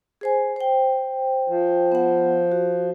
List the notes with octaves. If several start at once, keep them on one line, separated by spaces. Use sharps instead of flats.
G#4 C5 G#5
C5 G5
F3
B3 F#5
F#4